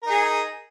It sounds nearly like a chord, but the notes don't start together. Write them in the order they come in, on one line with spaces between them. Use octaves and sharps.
A#4 D#4 G#4